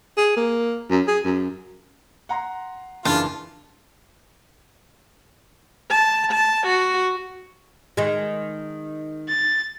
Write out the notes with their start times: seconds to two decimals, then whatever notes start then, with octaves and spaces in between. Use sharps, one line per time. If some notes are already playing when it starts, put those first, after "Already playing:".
0.17 G#4
0.37 A#3
0.90 F#2
1.07 G#4
1.25 F#2
2.29 F#5 A#5 C6
3.05 F#1 C#3 E3 D4 F4 A5
5.90 A5
6.32 A5
6.66 F#4
7.97 D#3 G#3
9.28 A6